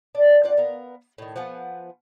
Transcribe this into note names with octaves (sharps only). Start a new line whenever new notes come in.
D4 D5
C4 F4 D5 F#5
B3 A#4 F5
A2 D#3
F3 B3 F#5 G#5